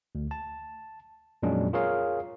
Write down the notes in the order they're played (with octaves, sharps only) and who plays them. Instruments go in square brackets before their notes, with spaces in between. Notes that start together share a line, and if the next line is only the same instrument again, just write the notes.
[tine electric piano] D2
A5
F2 A#2 F#3 G#3 C#4 D4
F4 G#4 A#4 C#5 F5